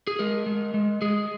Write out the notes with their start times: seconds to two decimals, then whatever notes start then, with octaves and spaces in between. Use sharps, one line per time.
0.07 G#4
0.19 G#3 A#4
0.46 G#3
0.74 G#3
1.02 G#3 G#4